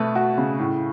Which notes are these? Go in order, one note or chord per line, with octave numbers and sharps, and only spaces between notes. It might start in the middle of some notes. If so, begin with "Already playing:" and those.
Already playing: B2 A3 B4
F#4
C#3
A2